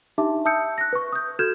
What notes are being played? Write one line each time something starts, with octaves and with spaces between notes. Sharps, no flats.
D4 D#4 G4 E5 A5 D6
E5 A5 D#6 E6 G6 C#7
F#6 A#6
B4 C#6
D#6 G6
F#4 A4 F6 G6 G#6 E7